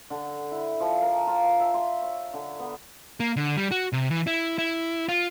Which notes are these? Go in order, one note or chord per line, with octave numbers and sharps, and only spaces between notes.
D3
E4
F3
A#4
F4
A5
E5
C6
C#5
D3
B3
A#3
D3
G3
F#4
C3
E3
E4
E4
F4